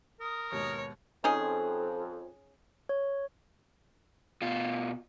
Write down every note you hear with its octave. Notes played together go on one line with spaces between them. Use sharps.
A#4 D#6
D#2 G#2 B2 C#5
F2 C#4 D#4 G#4
C#5
B2 F4